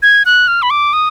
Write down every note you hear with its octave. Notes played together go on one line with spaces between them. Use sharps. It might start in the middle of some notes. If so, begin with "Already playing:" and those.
G#6
F#6
F6
B5
D6
D#6